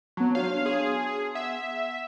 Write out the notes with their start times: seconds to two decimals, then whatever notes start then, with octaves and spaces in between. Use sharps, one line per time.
0.17 F#3 B3 A5
0.35 D4 F#4 C#5 F5
0.66 G#4 C6
1.35 E5 F#5